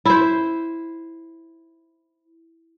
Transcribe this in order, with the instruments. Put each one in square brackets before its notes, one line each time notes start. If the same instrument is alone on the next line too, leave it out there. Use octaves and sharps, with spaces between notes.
[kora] E4 C5